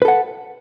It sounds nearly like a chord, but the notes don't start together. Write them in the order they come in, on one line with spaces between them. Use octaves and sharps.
B4 A4 F#5